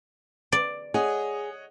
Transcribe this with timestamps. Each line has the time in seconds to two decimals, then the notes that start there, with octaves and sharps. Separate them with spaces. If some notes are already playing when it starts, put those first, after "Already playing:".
0.52 D5
0.94 G#4 C#5 D#5 F#5